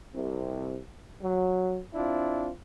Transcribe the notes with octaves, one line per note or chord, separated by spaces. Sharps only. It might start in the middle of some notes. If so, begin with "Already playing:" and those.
C2 C3
F#3
C4 D4 E4 F4